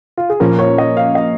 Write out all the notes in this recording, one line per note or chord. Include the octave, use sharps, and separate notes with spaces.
F4
G#4
A#2 F3 A#3 C#4 A#4
C#5
D#5
F5
D#5